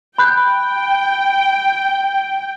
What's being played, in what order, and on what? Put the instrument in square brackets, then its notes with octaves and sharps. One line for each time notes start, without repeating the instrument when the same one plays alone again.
[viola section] G5 [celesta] B5 F#6 G6